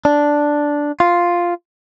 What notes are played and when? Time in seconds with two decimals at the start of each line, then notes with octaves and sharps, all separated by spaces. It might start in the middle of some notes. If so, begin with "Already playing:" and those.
0.05 D4
1.00 F4